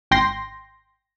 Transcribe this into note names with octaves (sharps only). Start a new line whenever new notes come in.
G#1 G5 C6 A#6